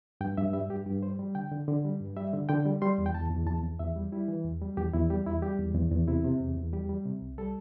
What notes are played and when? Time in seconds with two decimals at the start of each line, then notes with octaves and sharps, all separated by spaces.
0.21 G2 G5
0.37 G2 E5
0.53 G3 E5
0.70 G2 G4
0.86 G2 G4
1.02 G3 C5
1.19 G3
1.35 D3 G5
1.51 D3
1.68 D3
1.84 G3
2.01 G2
2.17 G3 E5
2.33 D3
2.49 D3 G5
2.65 G3
2.82 G3 C6
2.98 E2
3.06 G5
3.14 E2 A5
3.31 E2
3.46 E2 A5
3.64 E2
3.79 E2 E5
3.96 G3
4.12 G3 E4
4.28 E3
4.44 E2
4.61 G3
4.77 E2 G4
4.94 E2 E4
5.10 G3 G4
5.26 E2 E4
5.42 G3 G4
5.59 E2
5.75 E2
5.91 E2
6.08 C3 E4
6.24 C3
6.40 E2
6.57 E2
6.73 G3 G4
6.89 G3
7.05 C3
7.22 C2
7.38 G3 A4